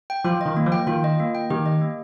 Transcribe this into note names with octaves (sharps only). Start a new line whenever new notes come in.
G5
F3 F4
D#3 D#5
A#3
F3
G5
D#3 F4
D#5
A#3
G5
D#3 G4
D#5
A#3